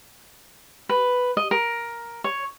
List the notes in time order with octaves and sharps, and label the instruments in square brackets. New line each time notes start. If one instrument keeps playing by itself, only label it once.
[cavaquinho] B4
D#5
A#4
C#5